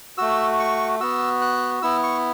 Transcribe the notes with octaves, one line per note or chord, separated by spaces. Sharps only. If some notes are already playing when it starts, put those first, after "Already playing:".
A3 F#4 E6
C#6
B3 F#4 E6
F#6
B3 E4 E6
C#6